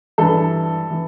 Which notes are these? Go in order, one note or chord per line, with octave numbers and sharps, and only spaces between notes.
G2 E3 A4
E3